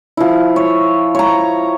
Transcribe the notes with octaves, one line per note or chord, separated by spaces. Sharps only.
F3 E4
C#5
C#5 A#5